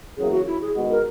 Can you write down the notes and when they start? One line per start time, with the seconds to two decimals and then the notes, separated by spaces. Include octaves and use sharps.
0.17 E2 C#3 F#3 A#3 E4 G#4
0.32 F#4
0.47 E4
0.62 G#4
0.76 D#3 G#3 B3 F#4
0.90 A#4